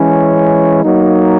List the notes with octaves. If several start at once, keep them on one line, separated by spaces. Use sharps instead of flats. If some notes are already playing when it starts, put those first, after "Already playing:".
Already playing: E3 G#3 C#4
F#3 A#3 D#4